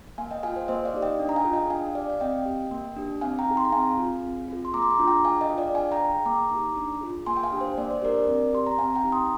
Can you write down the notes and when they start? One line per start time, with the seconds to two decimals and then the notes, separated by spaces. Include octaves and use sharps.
0.18 A#3 F5 G#5
0.31 D#5 G5
0.43 F4 G#4 F5 G#5
0.56 C5
0.68 A#3 C5 D#5
0.85 D5 F5
0.94 D#4 G4
1.02 D#5 G5
1.19 D4
1.29 A#5
1.36 F5 G#5
1.44 F4 G#4
1.53 D#5 G5
1.70 D4 F5 G#5
1.95 G4 D5 F5
2.10 F5
2.20 C4 D#5 G5
2.46 G4
2.71 A#3
2.97 D4 G4
3.21 C4 F5 G#5
3.39 G5 A#5
3.47 D#4 G#4
3.57 C6
3.65 A#5
3.72 C4 F5 G#5
3.98 F4 G#4
4.23 C4
4.48 F4 G#4
4.65 C6
4.74 A#3 A#5 D6
4.82 C6
4.90 A#5 D6
4.99 D4 F4 G#4
5.07 G5 A#5
5.25 D4 F5 G#5
5.41 D#5 G5
5.50 F4 G#4
5.58 D5 F5
5.75 D4 F5 G#5
5.92 G5 A#5
6.01 G#4
6.26 A#3 A#5 D6
6.51 D#4 G4
6.76 D4
7.01 F4 G#4
7.26 A#3 G#5 C6
7.37 G5
7.44 F5 G#5
7.52 D4 G4
7.61 C5
7.77 A#3 D5
7.91 C5
8.02 D4 G4 A#4 D5
8.28 C4
8.53 G4 C6
8.66 A#5
8.78 C4 F5 G#5
8.95 G5 A#5
9.04 D#4 G4
9.12 C6 D#6